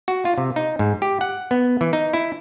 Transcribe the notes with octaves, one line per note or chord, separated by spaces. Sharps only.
F#4
F4
C3
D#4
G#2
G4
F#5
B3
E3
D#4
E4